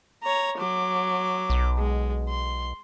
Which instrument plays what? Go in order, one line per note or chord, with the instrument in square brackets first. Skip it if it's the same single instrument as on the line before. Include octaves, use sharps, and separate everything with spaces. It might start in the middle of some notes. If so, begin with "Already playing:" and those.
[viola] C#5 A#5
F#3 D6
[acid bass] B1
[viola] G#3
C6